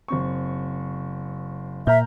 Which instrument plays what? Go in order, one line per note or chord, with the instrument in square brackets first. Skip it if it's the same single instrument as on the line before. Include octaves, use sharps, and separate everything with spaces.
[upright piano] F#1 C4 C#6
[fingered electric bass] A#2 [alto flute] E5 [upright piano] A#5 F6 G6